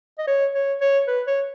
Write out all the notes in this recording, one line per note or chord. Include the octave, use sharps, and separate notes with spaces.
D#5
C#5
C#5
C#5
B4
C#5